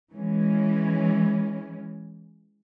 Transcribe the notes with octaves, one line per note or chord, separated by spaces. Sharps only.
E3 G#3 C#4